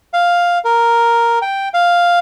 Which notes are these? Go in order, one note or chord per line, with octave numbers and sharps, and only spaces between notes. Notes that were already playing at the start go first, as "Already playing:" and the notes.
F5
A#4
G5
F5